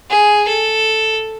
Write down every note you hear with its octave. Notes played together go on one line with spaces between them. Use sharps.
G#4
A4